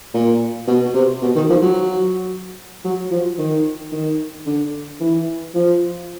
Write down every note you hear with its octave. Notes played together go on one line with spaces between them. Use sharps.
A#2
B2
C3
B2
D#3
F3
F#3
F#3
F3
D#3
D#3
D3
E3
F3